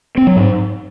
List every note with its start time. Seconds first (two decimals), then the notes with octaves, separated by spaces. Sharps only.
0.17 C4
0.27 F#3
0.36 G#2